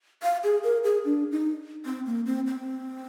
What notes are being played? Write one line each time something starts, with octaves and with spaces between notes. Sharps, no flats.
F5
G#4
A#4
G#4
D4
D#4
C4
A#3
C4
C4